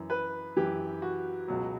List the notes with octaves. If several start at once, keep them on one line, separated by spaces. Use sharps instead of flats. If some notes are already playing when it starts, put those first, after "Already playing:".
Already playing: F#2 E3
B4
F#2 E3 G4
F#4
C#2 B2 F#3